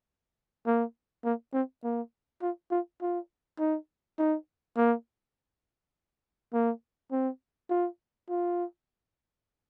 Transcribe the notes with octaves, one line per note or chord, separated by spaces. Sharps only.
A#3
A#3
C4
A#3
F4
F4
F4
D#4
D#4
A#3
A#3
C4
F4
F4